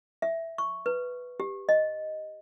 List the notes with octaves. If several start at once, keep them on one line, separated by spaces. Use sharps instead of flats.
E5
C#6
B4
G4
D#5